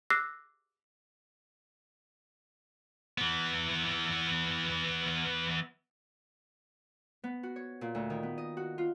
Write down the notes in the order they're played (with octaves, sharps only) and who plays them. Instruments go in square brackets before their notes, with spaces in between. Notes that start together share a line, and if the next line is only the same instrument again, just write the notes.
[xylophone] D6 E6 F#6 A#6 C7
[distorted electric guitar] E3 B3
[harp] B3
F#4
C#5
A#2
D2
D#3
B3
D#5
F#4
F4